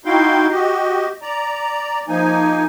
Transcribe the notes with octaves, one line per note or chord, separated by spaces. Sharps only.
D#4 E4 F#4 F5 G5 C6
F#4 G4 D#5
D5 A#5
F3 A#3 D#4 G#5